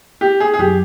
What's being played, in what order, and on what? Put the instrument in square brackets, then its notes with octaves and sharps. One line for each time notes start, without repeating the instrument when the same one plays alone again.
[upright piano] G4
G#4
G#4
[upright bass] F#2 [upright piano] G4